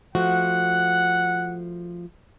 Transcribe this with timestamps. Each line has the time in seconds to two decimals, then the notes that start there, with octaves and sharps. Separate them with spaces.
0.15 F3 A3 F#4 F#5